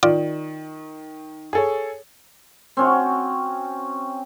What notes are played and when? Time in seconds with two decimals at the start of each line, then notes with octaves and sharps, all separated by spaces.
0.03 D#3 F4 D5
1.53 G#4 A4 C#5
2.77 C4 C#4 F#4